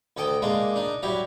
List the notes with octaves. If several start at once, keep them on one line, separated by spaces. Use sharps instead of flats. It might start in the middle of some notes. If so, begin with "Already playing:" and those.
D2 A4 D#5 G5
G#3 A#3 D4 D#4
D4 D#4
F#3 G3 E4 F5